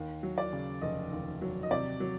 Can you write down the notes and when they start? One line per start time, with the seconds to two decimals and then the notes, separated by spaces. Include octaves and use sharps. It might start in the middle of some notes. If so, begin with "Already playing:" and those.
Already playing: D#2
0.23 F#3
0.38 D5
0.53 C#3
0.81 F1 D#5
1.12 D#2
1.42 F#3
1.63 D#5
1.71 C3 D5
2.00 F#3